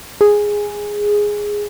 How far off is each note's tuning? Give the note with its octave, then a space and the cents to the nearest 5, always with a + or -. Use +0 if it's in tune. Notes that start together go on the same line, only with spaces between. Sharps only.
G#4 -5